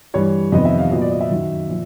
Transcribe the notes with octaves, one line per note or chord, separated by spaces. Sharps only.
G2 E3 G3 C#5
F2 C3 D#3 G3 B3 D#5
E5
F5
A#2 F#3 B3 D#5
D5
D#5
E5
F#2 D#3 F#3
A#2 F3